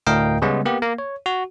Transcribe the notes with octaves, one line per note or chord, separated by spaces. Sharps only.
D2 A2 A#4 D#5 F5 G5
C#3 G3 G#3 B3 C#4
A#3 B3 G4
A#3
C#5
F#4